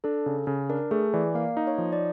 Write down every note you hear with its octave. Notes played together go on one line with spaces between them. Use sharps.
D4 A4
C#3
C#3
D4 A#4
A3 G#4
E3 D5
A#3 F5
D#4
C#5
F3
D5